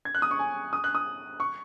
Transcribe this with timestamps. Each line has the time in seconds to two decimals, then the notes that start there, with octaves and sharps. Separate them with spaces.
0.05 G#6
0.15 F#6
0.22 D#6
0.31 C#6
0.39 G#5
0.73 D#6
0.84 F#6
0.95 D#6
1.40 C#6